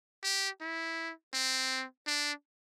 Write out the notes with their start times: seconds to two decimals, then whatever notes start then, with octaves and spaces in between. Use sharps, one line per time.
0.23 G4
0.61 E4
1.34 C4
2.07 D4